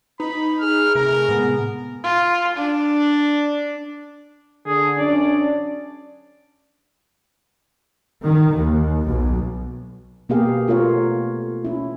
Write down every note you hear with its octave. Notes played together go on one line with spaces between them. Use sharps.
D#4 B4 B5
G#4 F6
C3 A3 A#4
A2 C3 G#3 B3
F4
D4
D3 G#4
F#2 C#4 D4 D5
D#3
D#2
B1
B2 A#3 B3 G4 G#4 F5
A3 B3 F4 A#4 C#5 F5
C#4 E4